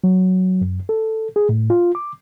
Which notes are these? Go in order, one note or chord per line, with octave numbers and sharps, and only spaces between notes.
F#3
F#2
A4
G#4
A2
F4
D6